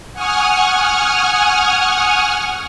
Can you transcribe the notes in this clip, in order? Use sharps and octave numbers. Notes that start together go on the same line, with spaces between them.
F#5 G#5 C#6 D#6 F6